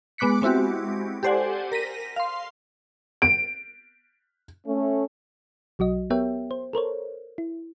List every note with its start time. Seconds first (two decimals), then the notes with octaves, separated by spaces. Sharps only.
0.18 G#3 B3 D6 F#6 B6 C#7
0.42 G#3 C4 E4 F#4 G4
1.23 G4 A4 C5 D5 F#5 G#5
1.72 A#4 A#6 B6 D#7
2.16 F5 C6
3.22 D7
4.66 A3 C#4
5.79 B1 F#3 F#4 D#5
6.10 B3 G4 A#4 C#5 E5 G5
6.51 C5
6.73 A4 A#4 C5 C#5
7.38 E4